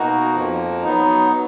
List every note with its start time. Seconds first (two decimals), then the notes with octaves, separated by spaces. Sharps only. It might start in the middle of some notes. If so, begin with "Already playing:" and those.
Already playing: B2 A#3 D#4 F#4
0.35 F2 F3 A#3
0.83 F#3 B3 D#4
1.31 F#3